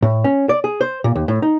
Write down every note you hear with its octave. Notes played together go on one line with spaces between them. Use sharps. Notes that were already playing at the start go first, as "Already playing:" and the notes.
A2
C#4
D5
G#4
C5
A#2
D#2
A2
D#4